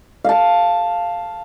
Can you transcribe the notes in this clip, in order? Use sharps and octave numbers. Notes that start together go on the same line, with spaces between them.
F5 A5